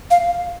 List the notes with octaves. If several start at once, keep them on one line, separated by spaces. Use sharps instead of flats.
F5